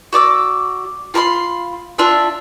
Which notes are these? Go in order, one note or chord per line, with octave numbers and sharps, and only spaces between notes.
F#4 D5 D6 E6
F4 F5 B5 C6
D4 F4 E5